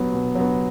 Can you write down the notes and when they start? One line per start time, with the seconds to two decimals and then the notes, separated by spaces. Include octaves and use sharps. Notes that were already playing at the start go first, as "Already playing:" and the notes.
Already playing: F#3 B3
0.13 B2
0.35 F#3 B3